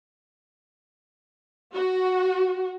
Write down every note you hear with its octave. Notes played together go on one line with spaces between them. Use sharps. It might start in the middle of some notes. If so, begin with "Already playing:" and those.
F#4